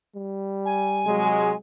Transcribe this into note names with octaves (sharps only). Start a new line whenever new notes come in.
G3
G#5
C3 F#3 G#3